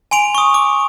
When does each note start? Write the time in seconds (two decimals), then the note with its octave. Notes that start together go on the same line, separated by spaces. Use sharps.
0.11 G#5 C6 D7 F7
0.35 C#6 D#6
0.54 D6